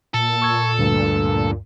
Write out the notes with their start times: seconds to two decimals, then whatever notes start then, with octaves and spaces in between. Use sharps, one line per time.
0.14 A#2 A4
0.42 C#6 E6 G#6
0.78 D2 G2